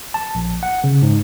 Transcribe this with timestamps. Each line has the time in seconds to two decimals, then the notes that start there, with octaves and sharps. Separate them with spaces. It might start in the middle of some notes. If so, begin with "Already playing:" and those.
0.14 A5
0.35 A#1
0.63 F#5
0.84 C#3
1.02 G#2